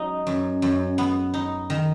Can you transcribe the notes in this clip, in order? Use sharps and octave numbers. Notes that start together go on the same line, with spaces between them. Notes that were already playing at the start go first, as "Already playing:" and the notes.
Already playing: F#3 D#4
F#2
F#2
B3
D#4
D#3